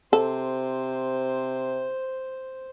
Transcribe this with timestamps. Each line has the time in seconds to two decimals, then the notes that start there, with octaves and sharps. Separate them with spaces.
0.13 C3 A4 C5